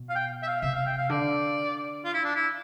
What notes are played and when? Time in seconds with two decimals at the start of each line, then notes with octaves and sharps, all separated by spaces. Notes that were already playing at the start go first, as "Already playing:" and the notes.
Already playing: B2
0.09 F5
0.15 G5
0.43 E5
0.47 F5
0.62 C3 E5
0.75 F5
0.86 G5
0.98 F5
1.09 D3 D5
2.04 F4
2.14 E4
2.24 D4
2.35 E4